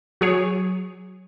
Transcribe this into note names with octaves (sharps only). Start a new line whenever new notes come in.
F#3 G#4 C#5